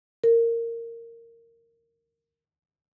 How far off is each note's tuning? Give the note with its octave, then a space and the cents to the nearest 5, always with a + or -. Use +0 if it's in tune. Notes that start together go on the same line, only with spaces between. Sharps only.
A#4 -15